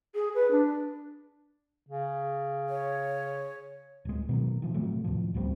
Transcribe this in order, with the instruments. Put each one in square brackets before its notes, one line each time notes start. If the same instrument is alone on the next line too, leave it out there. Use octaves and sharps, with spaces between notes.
[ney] G#4
B4
D4
[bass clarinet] C#3
[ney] C#5
[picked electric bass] D1 G#3
B2 D#3 F#3
D#3 F3
A2 C3 F#3 A3
D#2 A2 F3
A1 D2 G3 C4